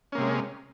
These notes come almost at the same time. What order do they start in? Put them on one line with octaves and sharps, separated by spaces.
C#4 A#3 C3 G#3